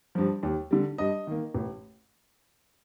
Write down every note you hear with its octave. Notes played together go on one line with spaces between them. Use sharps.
G2 F3
D#2
D3 G3
G2 D#5
D#3 A#3
A1